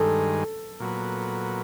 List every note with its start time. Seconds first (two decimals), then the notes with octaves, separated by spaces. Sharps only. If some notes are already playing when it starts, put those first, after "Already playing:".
Already playing: G2 D#3 G#3 A4
0.80 A#2 F#3 B3